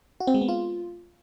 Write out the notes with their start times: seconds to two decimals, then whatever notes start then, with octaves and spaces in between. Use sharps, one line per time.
0.20 F#4
0.27 C4
0.34 G#3
0.41 B3
0.48 F4